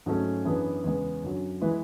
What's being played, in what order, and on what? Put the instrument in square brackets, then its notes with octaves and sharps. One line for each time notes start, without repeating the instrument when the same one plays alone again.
[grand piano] G#2 F#3 A3 C#4
F#2 E3 B3 D4 G#4
E2 C#3 G#3 B3
F#2 D3 F#3
E3 G#3 B3 E4 B4